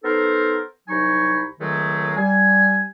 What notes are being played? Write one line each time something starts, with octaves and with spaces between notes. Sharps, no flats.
B3 D#4 A4 A#4 C5
C2 F#3 D#4 G#5 B5 C#6
C#2 D#3 F#3 G#3 A3
G3 G#5